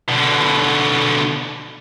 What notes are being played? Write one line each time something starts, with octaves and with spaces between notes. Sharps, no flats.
B2 D3